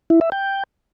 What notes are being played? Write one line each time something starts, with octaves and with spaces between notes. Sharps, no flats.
E4
E5
G5